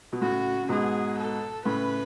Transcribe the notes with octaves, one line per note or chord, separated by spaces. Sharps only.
B2
A2 C#3 F#4
C#3
G#2 B2 G#4
A4
A2 C#3 B4